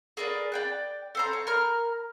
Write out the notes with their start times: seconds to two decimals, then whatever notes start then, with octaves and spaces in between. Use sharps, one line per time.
0.17 G#4 A#4 B4 D5
0.52 D5 G5 F#6
1.15 A4 C5 A#5
1.33 C#5
1.47 A#4 A#5 F6